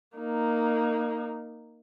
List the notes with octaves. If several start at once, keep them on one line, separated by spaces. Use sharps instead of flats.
A#3 D#4